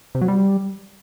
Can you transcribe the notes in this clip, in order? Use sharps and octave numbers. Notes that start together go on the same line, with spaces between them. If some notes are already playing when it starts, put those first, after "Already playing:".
C3
F#3
G3